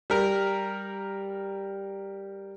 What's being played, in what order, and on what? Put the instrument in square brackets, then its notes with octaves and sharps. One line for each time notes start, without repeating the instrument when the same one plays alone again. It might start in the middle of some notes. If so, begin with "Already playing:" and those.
[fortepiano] G3 A#4